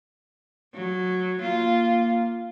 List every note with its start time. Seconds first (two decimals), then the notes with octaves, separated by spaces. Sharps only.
0.74 F#3
1.42 A#3 F4